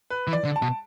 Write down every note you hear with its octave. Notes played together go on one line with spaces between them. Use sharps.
B4
E3
D5
D3
A5
B2